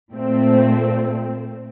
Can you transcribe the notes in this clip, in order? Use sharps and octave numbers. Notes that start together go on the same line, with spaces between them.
A#2 A3 C4